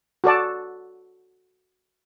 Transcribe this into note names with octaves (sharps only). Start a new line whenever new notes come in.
F#4 A4 D5 A5